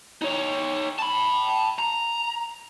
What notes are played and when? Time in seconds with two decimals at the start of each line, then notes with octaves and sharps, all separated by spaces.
0.22 D#4 C#5
0.99 A5 B5
1.79 A#5